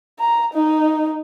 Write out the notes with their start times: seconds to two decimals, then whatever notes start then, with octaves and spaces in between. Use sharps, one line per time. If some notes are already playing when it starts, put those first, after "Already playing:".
0.19 A#5
0.53 D#4